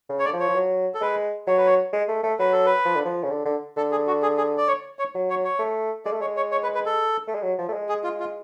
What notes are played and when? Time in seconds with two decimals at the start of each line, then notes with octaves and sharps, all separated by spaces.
0.09 C#3
0.19 C#5
0.25 D3 D5
0.33 F3
0.40 C#5
0.49 F3
0.55 F#3
0.95 A4
1.01 G#3 B4
1.47 F#3 C#5
1.57 B4
1.66 C#5
1.93 G#3
2.08 A3
2.24 A3
2.39 F#3 B4
2.52 A4
2.66 B4
2.85 F3
2.96 D3
3.05 F3
3.24 C#3
3.30 D3
3.45 D3
3.77 D3 A4
3.91 G#4
4.07 F#4
4.22 G#4
4.38 G#4
4.58 D5
4.68 C#5
4.99 C#5
5.15 F#3
5.30 C#5
5.44 C#5
5.59 A3
6.05 G#3 D5
6.13 A3
6.21 G#3 C#5
6.37 C#5
6.52 C#5
6.63 B4
6.74 B4
6.86 A4
7.28 A3
7.35 G#3
7.43 F#3
7.59 F3
7.69 A3
7.73 G#3
7.89 G#4
8.04 F4
8.20 F4